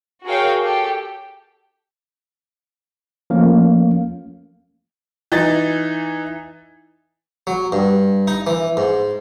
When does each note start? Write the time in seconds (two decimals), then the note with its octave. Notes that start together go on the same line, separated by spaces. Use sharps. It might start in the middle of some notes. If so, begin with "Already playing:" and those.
0.25 F#4 G#4 A#4 C#5 F5 G5
0.62 G4 A4
3.30 F3 A3 A#3 C#4 F5
5.32 E3 D#4 A6
7.47 F#3
7.72 G2
8.28 D#4
8.47 E3
8.77 G#2